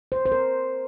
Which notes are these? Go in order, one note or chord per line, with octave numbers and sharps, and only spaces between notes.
C5
C5
A#4